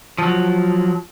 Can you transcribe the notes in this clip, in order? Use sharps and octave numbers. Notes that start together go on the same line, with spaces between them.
F3 F#3